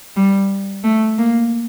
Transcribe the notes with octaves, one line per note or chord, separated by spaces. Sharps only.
G3
A3
A#3